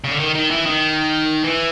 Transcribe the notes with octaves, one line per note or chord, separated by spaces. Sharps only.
C#3
D3
D#3
D#3
E3
D#3
E3